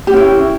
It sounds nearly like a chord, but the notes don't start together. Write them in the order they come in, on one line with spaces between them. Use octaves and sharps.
G4 F#4 C#4 E4